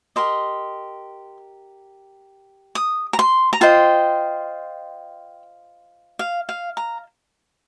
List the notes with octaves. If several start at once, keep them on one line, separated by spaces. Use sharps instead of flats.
G4 A#4 D#5 C6
D#6
A#5
C6
A#5
F4 C5 D#5 G5
F5
F5
A#5